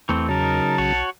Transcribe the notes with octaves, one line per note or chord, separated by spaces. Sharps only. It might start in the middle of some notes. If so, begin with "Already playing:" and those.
E2 E3 A3 C4
C#3 F#3 D#4 A#4 A5
B1 F#4 C#5